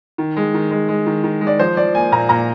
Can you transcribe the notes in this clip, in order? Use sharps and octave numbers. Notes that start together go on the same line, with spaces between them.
D#3
G#3
D#3
G#3
G#3
D#3
D#3
G#3
D5
F3 C5
F3 D5
A#3 G#5
A#2 A#5
A#2 A#5